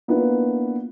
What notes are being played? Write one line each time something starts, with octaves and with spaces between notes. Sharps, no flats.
A#3 B3 D4 E4 F4 B4